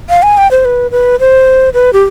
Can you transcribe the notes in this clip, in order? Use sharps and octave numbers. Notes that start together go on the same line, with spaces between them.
F5
G#5
G5
C5
B4
B4
C5
B4
G4